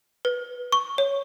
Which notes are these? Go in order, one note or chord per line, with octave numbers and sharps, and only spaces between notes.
B4
C#6
C#5